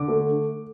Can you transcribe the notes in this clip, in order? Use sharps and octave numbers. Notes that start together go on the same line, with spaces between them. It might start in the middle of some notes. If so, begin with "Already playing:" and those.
Already playing: D3 D6
A3